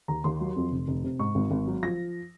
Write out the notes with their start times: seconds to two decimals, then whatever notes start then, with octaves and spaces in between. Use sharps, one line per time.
0.08 D#2 A#5
0.24 D#2 C6
0.41 F#3
0.56 F2
0.72 F1
0.88 F1
1.04 C3
1.19 G#2 C#6
1.35 G#1
1.51 G#1
1.67 F#3
1.83 F3 A#6